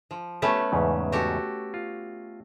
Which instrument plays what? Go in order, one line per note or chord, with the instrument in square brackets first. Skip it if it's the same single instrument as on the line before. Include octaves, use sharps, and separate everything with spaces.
[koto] F3
[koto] A3 B3 C#4 [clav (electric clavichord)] G4
[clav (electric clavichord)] E2 G#2 C#3
[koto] F#4 G4 A4
[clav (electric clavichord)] F4